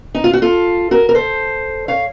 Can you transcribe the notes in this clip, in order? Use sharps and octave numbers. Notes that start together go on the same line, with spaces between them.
D#4
F4
F#4
F4 A4
F#4 A#4
A#4
A4 C5
C#5 F5